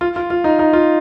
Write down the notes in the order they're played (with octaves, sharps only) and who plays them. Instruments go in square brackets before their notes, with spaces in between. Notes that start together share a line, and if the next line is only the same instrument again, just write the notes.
[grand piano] F4
F4
F4
D#4
D#4
F4